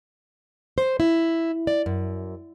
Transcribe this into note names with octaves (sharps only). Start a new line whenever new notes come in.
C5
E4
D5
F#2